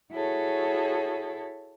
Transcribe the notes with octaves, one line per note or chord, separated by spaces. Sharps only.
E4 F#4 G#4 A4 C#5